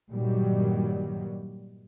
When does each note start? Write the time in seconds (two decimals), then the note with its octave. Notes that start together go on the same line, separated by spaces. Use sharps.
0.11 G2 A#2 D#3 F#3 G3